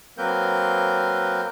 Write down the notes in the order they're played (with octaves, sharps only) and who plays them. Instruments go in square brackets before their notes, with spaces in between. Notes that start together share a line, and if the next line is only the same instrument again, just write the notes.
[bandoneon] F#3 A#3 C4 A#4 B4 G6